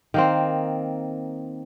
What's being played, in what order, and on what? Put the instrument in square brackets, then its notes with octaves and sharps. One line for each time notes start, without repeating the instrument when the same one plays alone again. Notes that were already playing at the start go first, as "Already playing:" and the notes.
[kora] D#3 A#3 C4